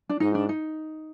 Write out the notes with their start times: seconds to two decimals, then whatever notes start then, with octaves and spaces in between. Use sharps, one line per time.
0.10 D4
0.20 G#2 D#4
0.35 D4
0.49 D#4